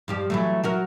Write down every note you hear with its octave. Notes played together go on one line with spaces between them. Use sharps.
G2 F3 G4
E3 F#3 A3
F#3 F#4 A#4